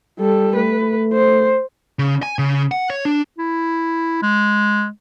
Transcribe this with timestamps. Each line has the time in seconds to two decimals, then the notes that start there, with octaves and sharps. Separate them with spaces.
0.19 G3 A4
0.56 A3 B4
1.13 C5
1.99 C#3
2.23 G#5
2.39 C#3
2.71 F#5
2.90 C#5
3.05 D4
3.39 E4
4.22 G#3